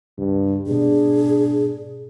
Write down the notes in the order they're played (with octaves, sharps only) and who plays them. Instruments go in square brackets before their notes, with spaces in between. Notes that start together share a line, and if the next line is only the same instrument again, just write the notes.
[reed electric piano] C#2 [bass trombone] G2
[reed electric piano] G#2 B2 [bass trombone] D4 [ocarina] G#4